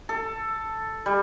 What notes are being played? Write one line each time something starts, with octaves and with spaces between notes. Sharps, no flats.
A4
G3